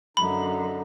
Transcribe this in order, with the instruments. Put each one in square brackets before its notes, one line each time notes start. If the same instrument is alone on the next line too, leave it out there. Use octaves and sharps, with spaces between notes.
[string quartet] F#2 [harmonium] D3 D#4 [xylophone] B5